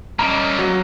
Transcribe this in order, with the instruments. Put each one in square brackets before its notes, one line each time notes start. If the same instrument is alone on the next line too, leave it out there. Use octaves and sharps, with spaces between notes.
[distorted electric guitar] G3 A#3 [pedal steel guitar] C#4 D#5 A#5
[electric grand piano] F#3